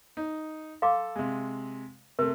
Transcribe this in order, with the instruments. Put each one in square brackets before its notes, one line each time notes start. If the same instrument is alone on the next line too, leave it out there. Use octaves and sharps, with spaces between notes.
[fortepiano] D#4
[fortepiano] A4 [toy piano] F5 C6 D6
[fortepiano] C3 G#3
[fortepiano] C3 A3 [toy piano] A#4